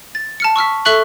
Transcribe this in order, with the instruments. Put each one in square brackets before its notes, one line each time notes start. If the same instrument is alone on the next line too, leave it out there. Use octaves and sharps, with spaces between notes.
[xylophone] A6
A5 F6 C#7
C#6 E6 F6 B6
A4 E5 C#6 F#6 F#7